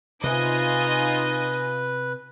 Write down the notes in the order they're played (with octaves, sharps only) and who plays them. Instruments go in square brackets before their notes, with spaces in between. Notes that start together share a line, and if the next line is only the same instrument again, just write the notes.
[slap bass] C3 [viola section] D#4 F4 [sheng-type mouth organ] B4 [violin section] D#5 G#5